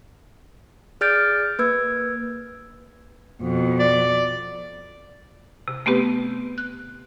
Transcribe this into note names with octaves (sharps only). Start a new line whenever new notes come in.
G#4 D5 F6 G6 A6 D7
A#3 B4 E6 G#6
F2 B2
D5
C3
A3 B3 C4 G4 B4
F#6